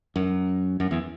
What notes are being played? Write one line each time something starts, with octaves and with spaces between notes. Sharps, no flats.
F#2
F#2
E2